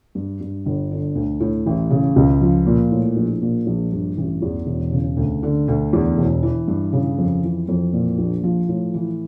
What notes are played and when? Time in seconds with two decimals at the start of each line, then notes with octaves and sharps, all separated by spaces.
0.15 G2
0.41 G2
0.66 G1
0.91 D3
1.15 D2
1.40 A2
1.66 A1
1.90 C#3
2.16 C#2
2.41 F3
2.66 A#2
2.91 A2
3.17 A#1
3.42 A#2
3.67 A#1
3.92 G2
4.17 A1
4.42 E2
4.67 E1
4.92 C#3
5.17 D2
5.43 D3
5.68 D2
5.93 E2
6.18 E1
6.43 E3
6.68 G2
6.93 C#3
7.18 F2
7.43 E3
7.68 F2
7.93 A#2
8.19 A#1
8.44 F3
8.69 A2
8.94 E3